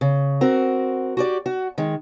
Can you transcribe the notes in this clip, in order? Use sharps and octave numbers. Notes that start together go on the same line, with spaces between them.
C#3
C4 F#4 A#4
F#4 G4 D5
F#4
D#3 G#3